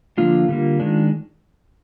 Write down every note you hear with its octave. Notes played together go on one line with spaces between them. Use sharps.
D3 F3 A#3 D4 F4
D3 G3 A#3
D#3 G#3 D4